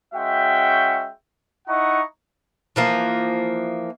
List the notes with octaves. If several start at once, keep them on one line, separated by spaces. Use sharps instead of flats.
G#3 C#4 F#4 E5 G5
D#4 E4 D#5 F#5 A#5 C#6
E3 F3 A#3